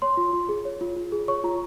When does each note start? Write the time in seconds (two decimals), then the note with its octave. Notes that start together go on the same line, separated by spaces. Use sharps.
0.02 C#5 C6
0.17 F4
0.33 F4
0.49 G#4
0.65 C#5
0.81 F4
0.96 F4
1.12 G#4
1.28 C#5 C#6
1.44 F4 A#5